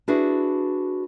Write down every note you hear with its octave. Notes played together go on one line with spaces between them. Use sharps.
D4 E4 F#4 G#4 B4